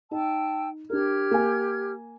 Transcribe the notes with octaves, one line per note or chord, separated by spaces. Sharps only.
D#4 G5 A5 E6
D4 G4 A#4 F6 G#6
A#3 G#5